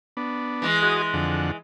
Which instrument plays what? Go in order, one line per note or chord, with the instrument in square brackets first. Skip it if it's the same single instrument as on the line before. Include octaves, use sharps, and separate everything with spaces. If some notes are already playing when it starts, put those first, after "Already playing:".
[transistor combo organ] B3 D4
[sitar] E3 G#3
[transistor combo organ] F#4 G#4 D#5
F2 D3 F#5